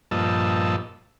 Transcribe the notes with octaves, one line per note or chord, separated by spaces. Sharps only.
G2 A#2 F3 D#5 A5 E6